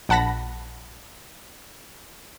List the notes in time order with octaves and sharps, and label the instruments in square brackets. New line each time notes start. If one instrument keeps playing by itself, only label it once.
[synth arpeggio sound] A#1 F#5 A5 B5 A#6